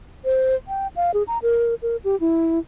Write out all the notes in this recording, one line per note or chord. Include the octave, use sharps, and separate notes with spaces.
C5
G5
F5
G#4
A#5
A#4
A#4
G4
E4